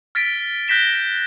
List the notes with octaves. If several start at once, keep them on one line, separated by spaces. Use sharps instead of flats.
F6 A6 B6 D7
F#6 G6 A#6 B6 E7 G7